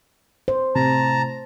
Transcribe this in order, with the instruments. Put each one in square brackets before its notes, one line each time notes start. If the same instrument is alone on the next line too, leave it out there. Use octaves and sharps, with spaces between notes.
[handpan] C5
[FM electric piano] A2 C3 [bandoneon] A5 A#5